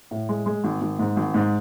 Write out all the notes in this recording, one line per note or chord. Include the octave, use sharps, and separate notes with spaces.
A2
G#3
G#3
G#1
G#1
G#2
G#1
G#2